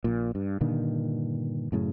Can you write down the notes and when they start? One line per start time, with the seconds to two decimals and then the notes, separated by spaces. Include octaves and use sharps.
0.04 A#1 A#2
0.35 G2
0.61 G2 A#2 D3 D#3
1.72 F#2 A2 C#3